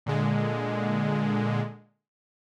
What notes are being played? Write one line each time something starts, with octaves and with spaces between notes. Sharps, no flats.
A#2 D3 G#3